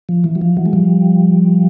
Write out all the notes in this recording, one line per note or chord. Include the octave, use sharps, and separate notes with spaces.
F3
E3
F#3
F3
E3 F#3
G#3
F3 G3